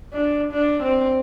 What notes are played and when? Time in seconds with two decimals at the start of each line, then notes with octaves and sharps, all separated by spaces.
0.14 D4
0.52 D4
0.83 C4